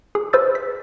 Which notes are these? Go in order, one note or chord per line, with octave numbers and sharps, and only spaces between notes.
G#4
B4 C5 E6 A6
B6